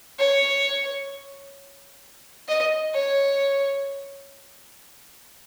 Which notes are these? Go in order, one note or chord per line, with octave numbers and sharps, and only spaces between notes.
C#5
D#5
C#5